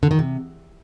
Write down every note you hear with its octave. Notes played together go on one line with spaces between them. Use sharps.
D3
D#3
C3